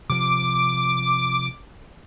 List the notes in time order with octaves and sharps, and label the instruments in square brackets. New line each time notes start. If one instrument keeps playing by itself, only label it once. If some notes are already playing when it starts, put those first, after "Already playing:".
[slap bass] C3 F3 [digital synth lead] D6